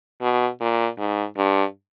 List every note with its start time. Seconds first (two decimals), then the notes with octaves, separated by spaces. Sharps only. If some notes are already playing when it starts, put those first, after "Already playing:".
0.22 B2
0.61 A#2
0.98 G#2
1.37 G2